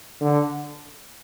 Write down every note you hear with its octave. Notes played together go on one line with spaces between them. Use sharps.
D3